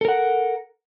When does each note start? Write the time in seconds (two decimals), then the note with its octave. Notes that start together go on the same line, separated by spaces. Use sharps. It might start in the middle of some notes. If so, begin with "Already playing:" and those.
0.01 A4
0.05 A#4
0.08 F#5